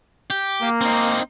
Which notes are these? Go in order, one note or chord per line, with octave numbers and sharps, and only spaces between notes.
G4
A#3
C4 D#4